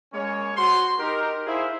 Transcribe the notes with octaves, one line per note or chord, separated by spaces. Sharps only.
G#3 A#3 C#4 C#5
F#4 C5 C6
D#4 G4 A#4
E4 G#4 C5 E5 F5